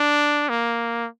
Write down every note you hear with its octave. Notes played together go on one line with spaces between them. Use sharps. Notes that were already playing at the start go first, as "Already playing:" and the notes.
Already playing: D4
A#3